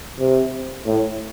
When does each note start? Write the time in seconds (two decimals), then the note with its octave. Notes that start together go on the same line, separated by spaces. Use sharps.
0.19 C3
0.87 A2